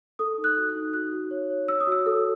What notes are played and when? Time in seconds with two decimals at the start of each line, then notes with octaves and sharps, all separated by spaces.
0.19 A4 D#6
0.38 D#4
0.44 F#6
0.56 F#4
0.69 F#6
0.75 D#4
0.93 F#4 F#6
1.12 F#4
1.31 C#5
1.50 C#5
1.68 C#5 E6
1.80 D#6
1.87 F#4 E6
2.06 A4